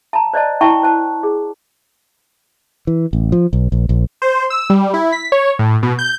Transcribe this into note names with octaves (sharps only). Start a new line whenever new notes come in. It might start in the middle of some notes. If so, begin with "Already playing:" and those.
A5 A#5
C5 D5 D#5 A5
E4 G5 A5 A#5 C#6
C5 A5
G#4
E3
A1
F3
B1
A#1
A#1
C5
E6
G3
E4
B6
C#5
A2
B2
G6